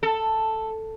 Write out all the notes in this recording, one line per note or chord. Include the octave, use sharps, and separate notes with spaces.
A4